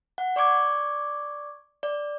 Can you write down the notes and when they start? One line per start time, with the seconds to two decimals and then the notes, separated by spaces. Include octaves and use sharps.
0.18 F#5
0.36 D5 C#6 D6 G#6
1.83 D5